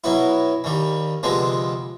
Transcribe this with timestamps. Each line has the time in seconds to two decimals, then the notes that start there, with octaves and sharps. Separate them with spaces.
0.04 B2 F#3 B3 E4
0.64 D#2 D#3 G3
1.23 D2 C3 F3 G#3 B3